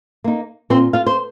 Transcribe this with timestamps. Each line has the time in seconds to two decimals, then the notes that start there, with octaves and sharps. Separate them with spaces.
0.24 A#3 D#4
0.70 A#2 C4 C5
0.93 F4 F5
1.06 C5